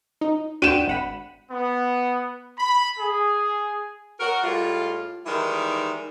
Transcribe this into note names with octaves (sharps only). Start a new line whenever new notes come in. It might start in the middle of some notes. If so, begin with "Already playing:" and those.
D#4
D4 F#4 G5 D#7 E7
G#1 F#5 B5
B3
B5
G#4
F#4 A#4
A2 G3 G#3 F4
D#3 E3 G3 G#3 D#4 E4